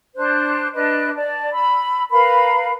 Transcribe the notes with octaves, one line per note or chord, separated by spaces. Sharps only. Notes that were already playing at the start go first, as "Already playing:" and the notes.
D4 C5 F#6
D4 B4 D#5 F#6
D5 A5
B5 E6
A#4 B4 F5 B5